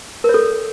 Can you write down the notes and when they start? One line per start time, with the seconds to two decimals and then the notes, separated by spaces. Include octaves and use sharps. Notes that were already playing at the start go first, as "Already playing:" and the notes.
0.24 A#4
0.29 C#5
0.34 A4